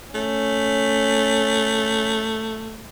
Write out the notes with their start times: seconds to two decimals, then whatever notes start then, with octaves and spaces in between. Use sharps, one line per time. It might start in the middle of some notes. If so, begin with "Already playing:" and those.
0.14 A3 C#4